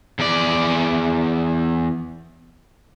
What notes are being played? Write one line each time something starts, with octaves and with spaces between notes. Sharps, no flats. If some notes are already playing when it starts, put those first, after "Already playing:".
E2 D5